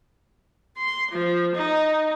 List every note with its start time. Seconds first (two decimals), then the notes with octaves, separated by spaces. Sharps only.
0.77 C6
1.11 F3
1.55 D#4